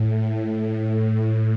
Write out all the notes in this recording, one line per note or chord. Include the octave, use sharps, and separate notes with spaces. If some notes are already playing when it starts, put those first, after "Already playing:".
Already playing: A2
A2